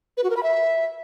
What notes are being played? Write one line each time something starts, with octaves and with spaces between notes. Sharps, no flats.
B4
F#4
A#4
B5
E5